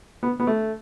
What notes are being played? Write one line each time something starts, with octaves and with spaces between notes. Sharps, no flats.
B3
B3
A3